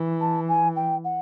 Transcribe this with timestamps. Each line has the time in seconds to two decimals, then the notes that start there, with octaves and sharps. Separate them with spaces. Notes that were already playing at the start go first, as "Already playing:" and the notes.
Already playing: E3
0.20 A5
0.48 G#5
0.76 G5
1.04 F#5